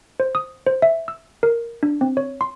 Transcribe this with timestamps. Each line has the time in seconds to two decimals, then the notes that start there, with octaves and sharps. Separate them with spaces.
0.20 C5
0.35 D#6
0.66 C5
0.82 E5
1.08 E6
1.43 A#4
1.83 D4
2.01 C4
2.17 C#5
2.41 C6